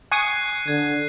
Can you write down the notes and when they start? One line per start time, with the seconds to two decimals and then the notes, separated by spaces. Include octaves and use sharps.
0.12 G#5 C#6 D#6 F#6 C7 D#7
0.68 D3 G#6